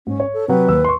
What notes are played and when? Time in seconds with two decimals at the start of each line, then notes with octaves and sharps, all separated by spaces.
0.07 G#2 C#4
0.20 C#5
0.34 A4
0.48 C3 F#3 B4 G5
0.68 D#2 E6
0.84 C6 C#6